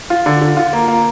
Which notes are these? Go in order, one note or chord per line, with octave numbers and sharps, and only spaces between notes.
F4
D3
D3
F4
A#3
A#3